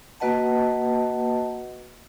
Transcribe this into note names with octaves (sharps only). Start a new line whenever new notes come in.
A#3 F#4 B4 D#5 F#5 A5